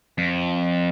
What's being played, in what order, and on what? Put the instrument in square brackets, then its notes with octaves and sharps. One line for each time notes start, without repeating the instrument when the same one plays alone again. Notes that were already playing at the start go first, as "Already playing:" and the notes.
[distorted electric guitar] F2